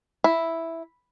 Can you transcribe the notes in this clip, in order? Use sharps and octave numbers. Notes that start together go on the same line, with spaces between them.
E4